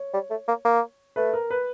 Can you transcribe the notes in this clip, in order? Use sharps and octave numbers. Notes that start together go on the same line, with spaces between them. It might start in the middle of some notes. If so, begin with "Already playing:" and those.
Already playing: C#5
G3
A3
A#3
A#3
A3 B4
A#4
B4